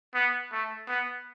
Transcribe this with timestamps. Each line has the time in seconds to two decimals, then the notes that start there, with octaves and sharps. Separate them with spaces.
0.15 B3
0.52 A3
0.88 B3